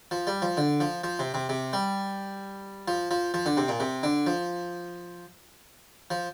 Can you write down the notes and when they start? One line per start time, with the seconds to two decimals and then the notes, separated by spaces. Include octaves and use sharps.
0.11 F3
0.27 G3
0.42 F3
0.57 D3
0.80 F3
1.04 F3
1.19 C3
1.34 C3
1.49 C3
1.73 G3
2.88 F3
3.11 F3
3.34 F3
3.46 D3
3.57 C3
3.68 A#2
3.80 C3
4.03 D3
4.27 F3
6.11 F3